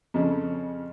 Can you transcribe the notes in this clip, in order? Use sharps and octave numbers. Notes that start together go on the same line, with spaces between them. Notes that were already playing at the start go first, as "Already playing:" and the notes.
F2 C#3